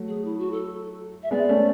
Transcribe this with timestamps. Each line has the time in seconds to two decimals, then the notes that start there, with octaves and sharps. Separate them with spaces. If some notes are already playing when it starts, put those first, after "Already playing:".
Already playing: F#3 A3
0.08 G#4
0.25 E4
0.39 F#4
0.52 A4
1.23 E5
1.31 G#3 B3 D5
1.49 A3 C#4